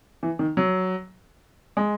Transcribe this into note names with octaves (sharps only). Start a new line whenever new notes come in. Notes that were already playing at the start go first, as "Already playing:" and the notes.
E3
D#3
F#3
G#3